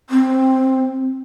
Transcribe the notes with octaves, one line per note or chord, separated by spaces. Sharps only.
C4